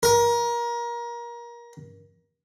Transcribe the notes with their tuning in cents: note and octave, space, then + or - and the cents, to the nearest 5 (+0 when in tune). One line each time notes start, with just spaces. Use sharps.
A#4 +25